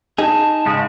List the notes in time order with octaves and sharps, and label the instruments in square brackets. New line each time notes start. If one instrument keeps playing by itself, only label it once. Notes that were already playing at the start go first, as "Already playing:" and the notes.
[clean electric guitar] D#4 G#4 [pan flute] A5
[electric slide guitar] G#2 C#3 G#3